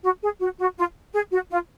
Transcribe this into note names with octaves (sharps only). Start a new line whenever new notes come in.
F#4
G#4
F#4
F#4
F4
G#4
F#4
F4